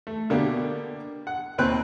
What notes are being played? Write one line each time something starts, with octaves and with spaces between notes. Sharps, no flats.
A3
B2 D3 A#3 B3 D4 G4
F#5
D#2 A#2 C4 B4 G5 F#6